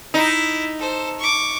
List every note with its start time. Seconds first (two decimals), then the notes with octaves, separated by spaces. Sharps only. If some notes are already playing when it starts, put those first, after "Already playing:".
0.14 D#4 E4
0.79 A4 C5
1.19 C#6 D6